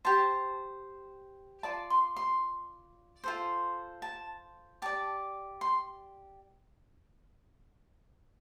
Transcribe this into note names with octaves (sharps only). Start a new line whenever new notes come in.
G4 C5 A5
F4 D5 A5
C6
C6
F4 A4 C5
A5
G4 D5 A5
C6